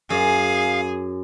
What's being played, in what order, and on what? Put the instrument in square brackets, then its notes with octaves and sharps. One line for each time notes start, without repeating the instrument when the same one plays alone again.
[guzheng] F#2 [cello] G#4 [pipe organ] F5